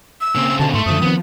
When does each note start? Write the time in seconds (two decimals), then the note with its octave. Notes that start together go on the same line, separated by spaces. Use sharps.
0.21 E6
0.35 C#3 A#3 C4
0.59 B2 D3 A5
0.74 G#2 A3 C6
0.86 F#2 D3 F3 D#6
1.02 D#3 B3 C4